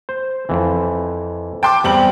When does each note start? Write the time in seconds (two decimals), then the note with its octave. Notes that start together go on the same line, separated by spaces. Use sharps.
0.09 C5
0.49 F2 E3
1.63 G5 A5 C6 D6
1.84 E2 G3 B3 C4 F#7